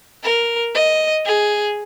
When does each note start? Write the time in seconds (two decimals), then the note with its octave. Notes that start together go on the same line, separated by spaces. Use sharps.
0.23 A#4
0.74 D#5
1.26 G#4